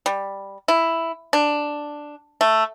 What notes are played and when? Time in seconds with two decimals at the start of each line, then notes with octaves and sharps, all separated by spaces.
0.06 G3
0.68 E4
1.33 D4
2.41 A3